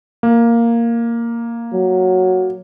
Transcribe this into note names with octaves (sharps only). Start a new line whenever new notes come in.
A#3
F#3